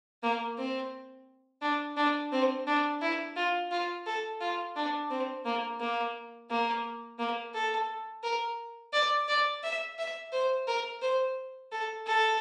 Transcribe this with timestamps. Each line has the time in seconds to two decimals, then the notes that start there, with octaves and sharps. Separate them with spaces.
0.23 A#3
0.58 C4
1.62 D4
1.97 D4
2.32 C4
2.67 D4
3.01 E4
3.36 F4
3.71 F4
4.06 A4
4.41 F4
4.76 D4
5.10 C4
5.45 A#3
5.80 A#3
6.50 A#3
7.19 A#3
7.54 A4
8.23 A#4
8.93 D5
9.28 D5
9.63 E5
9.98 E5
10.32 C5
10.67 A#4
11.02 C5
11.72 A4
12.07 A4